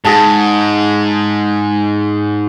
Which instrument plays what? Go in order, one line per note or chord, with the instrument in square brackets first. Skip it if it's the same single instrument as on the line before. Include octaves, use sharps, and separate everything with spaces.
[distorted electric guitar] G#2 [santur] G#4 A5